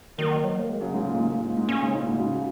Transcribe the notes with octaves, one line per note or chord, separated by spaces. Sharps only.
D#3 F#3 A#3
F#3
A#3
G#3
C#3 F#3
G#2 C#3
A#2
G#2 C#3
A#2
G#2
G#2
A#2 C#4
G#2 C#3
A#2 D#4
G#2 C#3
G#2 C#3 F#4